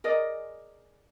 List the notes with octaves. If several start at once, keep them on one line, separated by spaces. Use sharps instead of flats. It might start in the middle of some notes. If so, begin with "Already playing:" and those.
G#4 A#4 D5 D#5